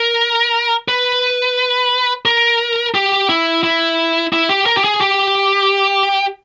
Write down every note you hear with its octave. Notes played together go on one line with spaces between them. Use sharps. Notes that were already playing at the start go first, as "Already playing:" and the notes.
Already playing: A#4
B4
A#4
G4
E4
E4
E4
G4
A#4
G4
G#4
G4